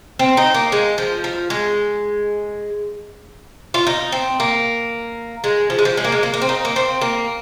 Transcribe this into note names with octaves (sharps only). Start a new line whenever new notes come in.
C4
D#4
A#3
G#3
F3
F3
G#3
F4
D#4
C4
A#3
G#3
F3
G#3
F3
G#3
A#3
G#3
A#3
A#3
C4
D#4
A#3
C4
A#3